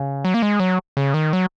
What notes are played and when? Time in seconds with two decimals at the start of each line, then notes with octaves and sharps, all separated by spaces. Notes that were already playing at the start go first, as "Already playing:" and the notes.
Already playing: C#3
0.25 F#3
0.34 A#3
0.42 G#3
0.60 F#3
0.97 C#3
1.14 D#3
1.33 F#3